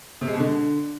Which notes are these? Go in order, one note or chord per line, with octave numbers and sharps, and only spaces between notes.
C3
G#3
B2
D3